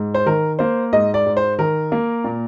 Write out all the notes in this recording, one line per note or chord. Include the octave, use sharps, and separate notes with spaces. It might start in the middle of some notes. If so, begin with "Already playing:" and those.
Already playing: G#2
C5
D#3 A#4
A#3 C5
G#2 D#5
D5
G#2
C5
D#3 A#4
A#3
A#2